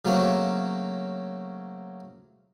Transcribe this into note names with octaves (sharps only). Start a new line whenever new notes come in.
C#3 F#3 A3 A#3 C4 C#4